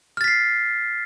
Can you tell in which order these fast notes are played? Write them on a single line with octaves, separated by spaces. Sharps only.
F6 A6 B6 C7